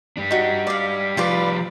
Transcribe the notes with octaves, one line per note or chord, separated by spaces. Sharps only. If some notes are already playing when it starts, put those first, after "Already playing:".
G3 D4
D#4 F#4
D5 F5
F3 G3 F4 B4 D5